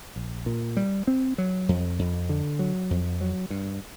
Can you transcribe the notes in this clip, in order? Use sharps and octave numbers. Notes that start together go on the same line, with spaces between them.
A#1
A#2
G3
C4
F#3
F2
F2
D3
F#3
F2
F#3
G2